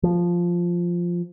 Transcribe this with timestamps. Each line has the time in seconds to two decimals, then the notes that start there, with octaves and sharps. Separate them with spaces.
0.03 F3